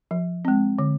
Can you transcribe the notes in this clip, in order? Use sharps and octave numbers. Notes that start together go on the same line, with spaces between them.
F3
G#3 C4
D3